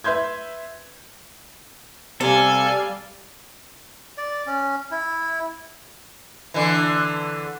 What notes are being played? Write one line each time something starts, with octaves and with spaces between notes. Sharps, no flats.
B4 E5 C6 G6 G#6
C3 G3 A4 D5 F5 G#5
D5
C#4
E4
D3 E3